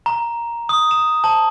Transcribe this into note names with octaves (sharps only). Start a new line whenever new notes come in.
A#5
D#6
E7
A5